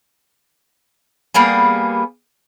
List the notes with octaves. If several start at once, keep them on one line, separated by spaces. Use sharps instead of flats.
G3 A#3 B3 G#4